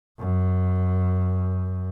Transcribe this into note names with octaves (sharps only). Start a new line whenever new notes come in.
F#2